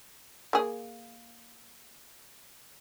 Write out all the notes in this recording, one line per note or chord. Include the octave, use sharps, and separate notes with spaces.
A#3 G#4